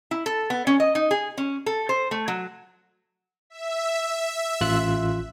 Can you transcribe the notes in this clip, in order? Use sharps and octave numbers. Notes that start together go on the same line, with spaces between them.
E4
A4
B3
C#4
D#5
D#4
G#4
C#4
A4
C5
A3
F#3
E5
A1 F4 F#6